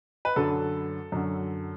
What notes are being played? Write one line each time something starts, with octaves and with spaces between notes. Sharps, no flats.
B4
F#2 D3 F#3 A4
F#2 D3 F#3